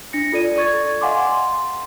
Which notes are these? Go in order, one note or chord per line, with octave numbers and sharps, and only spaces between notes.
D4 A#6 C#7
F4 A4 D5 D#7
A4 D5 C#6 G#6 A6
D#5 F5 F#5 G#5 C6 D6
C6